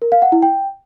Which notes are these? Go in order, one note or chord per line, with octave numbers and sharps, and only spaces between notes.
A#4
F5
F#5
E4
G5